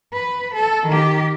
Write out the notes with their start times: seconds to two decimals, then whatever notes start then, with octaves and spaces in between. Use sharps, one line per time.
0.13 B4
0.54 A4
0.86 D#3 G4